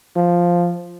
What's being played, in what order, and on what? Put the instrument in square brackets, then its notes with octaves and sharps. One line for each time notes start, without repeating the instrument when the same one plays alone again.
[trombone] F3